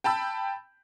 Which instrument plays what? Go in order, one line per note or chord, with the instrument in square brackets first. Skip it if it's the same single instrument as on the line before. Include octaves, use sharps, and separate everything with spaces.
[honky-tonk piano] G5 A5 B5 E6